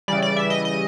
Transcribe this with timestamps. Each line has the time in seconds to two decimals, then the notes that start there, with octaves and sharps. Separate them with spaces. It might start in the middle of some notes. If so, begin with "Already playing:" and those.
0.08 C#3 E3 G3 D5
0.22 D5
0.37 E5
0.50 D#5
0.65 D#5